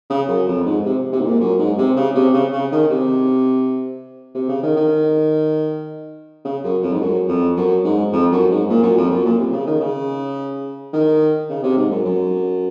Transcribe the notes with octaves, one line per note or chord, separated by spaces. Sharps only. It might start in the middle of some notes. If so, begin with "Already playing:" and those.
C#3
F#2
F2
G#2
C3
C3
G#2
A#2
F#2
G#2
C3
C#3
C3
C#3
C#3
D#3
C3
C3
C#3
D#3
D#3
C#3
F#2
F2
G#2
F#2
F2
F#2
G#2
F2
F#2
G#2
A#2
F#2
F2
F#2
A#2
C3
C#3
D#3
C#3
D#3
C#3
C3
G#2
F#2
F#2